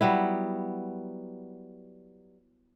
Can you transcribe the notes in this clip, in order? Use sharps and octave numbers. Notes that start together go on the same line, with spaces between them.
F#3 G3 B3 E4